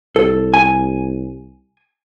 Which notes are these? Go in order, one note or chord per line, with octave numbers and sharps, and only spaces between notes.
C2 A4
G#5